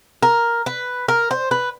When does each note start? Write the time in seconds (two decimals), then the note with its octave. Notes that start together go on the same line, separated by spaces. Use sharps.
0.23 A#4
0.66 B4
1.08 A#4
1.31 C5
1.51 B4